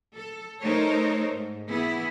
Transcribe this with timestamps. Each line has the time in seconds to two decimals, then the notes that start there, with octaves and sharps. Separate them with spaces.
0.15 A4
0.62 A3 D#4 A4 A#4 C5 C#5
1.33 G#2
1.70 E3 B3 E4 G#4